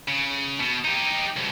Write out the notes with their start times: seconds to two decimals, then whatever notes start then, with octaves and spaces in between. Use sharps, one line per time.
0.08 C#3
0.60 B2
0.85 D#4 G4
1.36 C2 B2